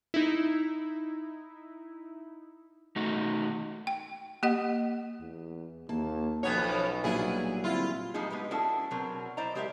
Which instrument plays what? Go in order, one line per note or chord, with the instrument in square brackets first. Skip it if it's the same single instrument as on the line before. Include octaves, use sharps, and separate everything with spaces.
[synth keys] D#4 E4
[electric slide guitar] A3 D#4 F#4
[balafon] G5
A#3 G4 D#5 F#5
[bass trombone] E2
[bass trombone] D#2 [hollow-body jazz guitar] A#3 [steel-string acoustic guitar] A5
[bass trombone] B1 [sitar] F2 B3 C#5 [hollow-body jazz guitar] C#4 F#4 F#5
[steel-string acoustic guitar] A#2 F#3 G3 [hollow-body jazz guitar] D4 F5 G#5 [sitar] E4 G#4
[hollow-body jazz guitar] D3 C4 [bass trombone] E4 [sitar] F4
[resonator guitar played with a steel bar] F3 G3 G#3 A#3 D#4 G#4
G#3 B3 G4 B4
C#4 D4 E4 F#4 G#4 A4
B2 F#3 C4 A#4
E4 C5 D5 D#5 A#5
G#3 G4 A#4 C5 E5